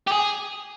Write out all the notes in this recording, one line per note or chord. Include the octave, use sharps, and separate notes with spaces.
G4
G#4